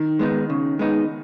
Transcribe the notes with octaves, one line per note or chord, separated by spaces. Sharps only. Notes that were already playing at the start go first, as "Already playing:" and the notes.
Already playing: D#3
G#3 B3 D#4
C#3
G#3 B3 D#4